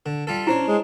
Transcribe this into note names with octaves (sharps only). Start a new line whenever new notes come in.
D3
G3 F4 A4
C#4 D4 E4 C5 C#5
G#3